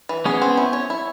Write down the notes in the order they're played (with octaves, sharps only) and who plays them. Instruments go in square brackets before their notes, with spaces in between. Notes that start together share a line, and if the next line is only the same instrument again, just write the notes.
[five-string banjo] E3
[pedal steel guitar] B3 C#4 [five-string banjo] G#4
[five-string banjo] C4
E4
C#5
E4